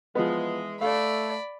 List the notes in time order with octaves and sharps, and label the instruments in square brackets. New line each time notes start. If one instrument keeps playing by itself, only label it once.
[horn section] E3 G#3 [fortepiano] F3 B3
[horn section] A3 [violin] D5 B5 [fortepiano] F5